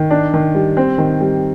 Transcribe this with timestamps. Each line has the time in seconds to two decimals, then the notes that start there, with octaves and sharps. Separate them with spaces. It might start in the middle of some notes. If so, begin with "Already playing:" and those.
Already playing: D#3
0.11 D4
0.34 D#3
0.55 G3
0.77 C4
0.98 D#3
1.21 G3